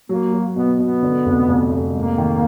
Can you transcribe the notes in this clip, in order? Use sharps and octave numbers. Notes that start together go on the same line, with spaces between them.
F#3 A#3
F#3
B2 B3
B2 B3
D3
F1
F1
F1
G#2 A#3
D#3